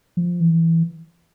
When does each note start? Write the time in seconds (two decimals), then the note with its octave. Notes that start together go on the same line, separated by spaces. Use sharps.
0.17 F3
0.40 E3